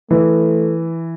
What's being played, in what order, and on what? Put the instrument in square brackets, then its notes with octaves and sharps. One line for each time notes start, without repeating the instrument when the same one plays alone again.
[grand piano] E3 [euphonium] A3